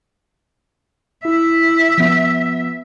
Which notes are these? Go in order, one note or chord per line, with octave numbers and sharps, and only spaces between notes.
E4 E5
F3 B3